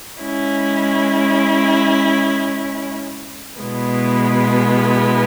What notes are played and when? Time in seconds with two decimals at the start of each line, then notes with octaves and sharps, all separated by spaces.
0.20 G#3 C#4 E4
3.60 B2 G#3 B3 E4